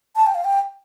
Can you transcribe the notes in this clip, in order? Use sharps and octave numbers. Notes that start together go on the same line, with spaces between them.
A5
G5
F5
G5